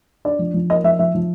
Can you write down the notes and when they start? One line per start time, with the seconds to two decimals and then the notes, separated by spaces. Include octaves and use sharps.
0.25 D4 D5
0.39 F3
0.54 F3
0.70 A#3 D#5
0.84 F3 E5
0.99 F3 E5
1.15 F3